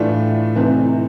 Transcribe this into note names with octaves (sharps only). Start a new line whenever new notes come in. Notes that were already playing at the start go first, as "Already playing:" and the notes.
Already playing: A2 E3 A3 D4 F4
C3 E3 A3 C4 D#4